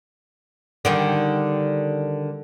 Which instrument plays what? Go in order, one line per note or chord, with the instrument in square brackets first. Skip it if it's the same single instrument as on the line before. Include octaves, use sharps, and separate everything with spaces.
[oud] D3 D#3 G3